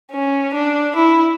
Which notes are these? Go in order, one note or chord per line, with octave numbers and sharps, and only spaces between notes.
C#4
D4
E4